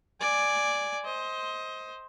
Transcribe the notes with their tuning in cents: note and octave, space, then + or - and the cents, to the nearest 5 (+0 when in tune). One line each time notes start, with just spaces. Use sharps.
D5 +0 G#5 +0
C5 +5 D#5 +25